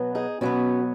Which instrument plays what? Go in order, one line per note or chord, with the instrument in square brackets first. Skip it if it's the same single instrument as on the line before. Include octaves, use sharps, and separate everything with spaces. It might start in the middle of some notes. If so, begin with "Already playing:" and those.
Already playing: [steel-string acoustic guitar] B2 F#3 B3
D#4 G#4
B2 F#3 B3 C#4 F#4